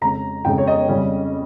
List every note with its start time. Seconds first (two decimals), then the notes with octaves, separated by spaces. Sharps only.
0.01 F2 C#3 G#3 A#5
0.45 F2 C#3 G#3 G5
0.58 C#5
0.67 D#5
0.88 F2 C#3 G3 C#4